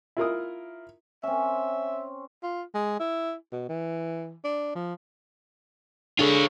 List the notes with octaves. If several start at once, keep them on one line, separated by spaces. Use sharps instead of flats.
E4 F4 A#4 D#6
C4 C#4 E5
F4
G#3
E4
B2
E3
D4
F3
D4 F4 G#4 A4 C#5